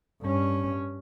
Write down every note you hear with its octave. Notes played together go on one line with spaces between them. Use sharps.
G2 C#4